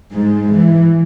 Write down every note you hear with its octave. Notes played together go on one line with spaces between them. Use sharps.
G#2
E3